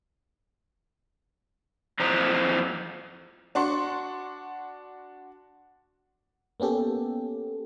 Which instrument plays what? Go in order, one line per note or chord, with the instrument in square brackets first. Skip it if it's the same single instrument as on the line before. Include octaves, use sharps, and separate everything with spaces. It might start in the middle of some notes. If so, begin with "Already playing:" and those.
[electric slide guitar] F2 F#3 E4 C5 D#5 A#5
[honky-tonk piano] D4 F#4 C6 C#6
[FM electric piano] A#3 B3 C#4 G4 A4